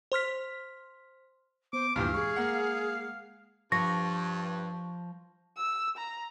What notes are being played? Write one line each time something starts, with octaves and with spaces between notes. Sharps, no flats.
C5 C6 F6 B6
B3 C5 D6
D2 G2 A#2 E3 G4 F5
G#3 G#4 C#6
A#3 F#5
G2 F3 C#6 A#6
E6
A#5